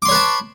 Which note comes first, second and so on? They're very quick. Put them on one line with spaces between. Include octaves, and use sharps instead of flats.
D6 C6 C#5 B4 A5